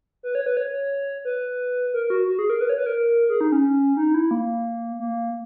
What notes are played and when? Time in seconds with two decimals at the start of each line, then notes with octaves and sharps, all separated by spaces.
0.23 B4
0.35 C#5
0.46 B4
0.57 C#5
1.25 B4
1.94 A#4
2.10 F#4
2.27 F#4
2.39 G#4
2.50 A#4
2.61 B4
2.69 C#5
2.78 B4
2.86 A#4
3.29 G#4
3.41 D#4
3.52 C#4
3.97 D#4
4.14 E4
4.31 A#3
4.99 A#3